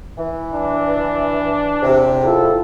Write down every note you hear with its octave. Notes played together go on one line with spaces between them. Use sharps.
E3
D4
E2 C3
E4 F4 A4